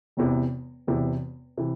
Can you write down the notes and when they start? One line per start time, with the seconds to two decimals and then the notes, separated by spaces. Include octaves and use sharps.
0.17 E1 E2 C3 E3
0.87 E1 E2 C3 E3
1.57 C3 E3